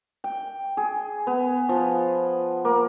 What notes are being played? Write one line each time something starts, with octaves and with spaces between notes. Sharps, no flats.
G5
G#4
B3
F3
A#3